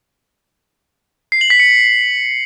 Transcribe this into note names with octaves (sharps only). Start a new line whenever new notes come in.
C7
F#7
B6
C#7